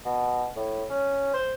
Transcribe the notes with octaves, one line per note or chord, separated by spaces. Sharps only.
B2
A2
C#4
C5